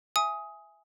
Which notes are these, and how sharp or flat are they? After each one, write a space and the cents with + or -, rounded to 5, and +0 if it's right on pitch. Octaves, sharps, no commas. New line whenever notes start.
E5 +10 G#5 +0 D#6 +20